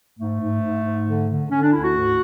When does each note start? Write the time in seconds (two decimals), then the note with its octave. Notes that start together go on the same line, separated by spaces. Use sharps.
0.18 G#2 A3
0.40 G#2
0.62 G#2
0.84 G#2
1.06 D3
1.29 D3
1.50 D3 C#4
1.62 D4
1.72 D2 E4
1.83 F#4
1.95 G#2